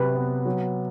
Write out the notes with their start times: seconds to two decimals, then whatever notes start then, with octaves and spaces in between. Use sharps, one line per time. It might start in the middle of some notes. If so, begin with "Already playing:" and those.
Already playing: C3 F#3 F#4 B4
0.15 B3
0.46 F#3